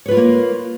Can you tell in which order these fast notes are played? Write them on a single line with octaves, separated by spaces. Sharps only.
C#5 B4 F4 A#4 A#3